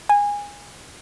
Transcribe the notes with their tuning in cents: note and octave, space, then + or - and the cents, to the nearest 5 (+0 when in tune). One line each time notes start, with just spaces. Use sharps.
G#5 -20